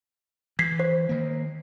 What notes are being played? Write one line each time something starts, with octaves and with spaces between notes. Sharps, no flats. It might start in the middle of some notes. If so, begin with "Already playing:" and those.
E3 G#6 B6 C7
C5
D#3 A#3